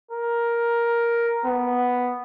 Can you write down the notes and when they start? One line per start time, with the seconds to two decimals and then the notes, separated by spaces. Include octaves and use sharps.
0.11 A#4
1.46 B3